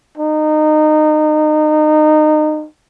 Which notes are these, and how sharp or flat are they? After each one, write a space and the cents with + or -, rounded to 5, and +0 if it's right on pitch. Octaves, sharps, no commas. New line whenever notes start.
D#4 -25